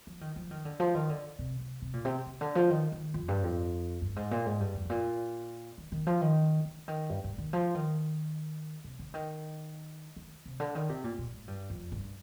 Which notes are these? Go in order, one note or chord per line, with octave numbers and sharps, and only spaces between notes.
F3
D#3
F3
D#3
D3
F3
D#3
D3
C3
C3
C3
A#2
C3
C3
D3
F3
D#3
D#3
F2
G2
F2
G2
G#2
A#2
G#2
G2
F2
G#2
A#2
D#3
D#3
F3
D#3
D3
D#3
G2
G2
D#3
F3
D#3
C3
D3
D#3
D#3
C3
D3
D#3
C3
A#2
A#2
G#2
G2
F2
G2